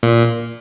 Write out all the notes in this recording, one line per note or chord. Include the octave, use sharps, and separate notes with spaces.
A#2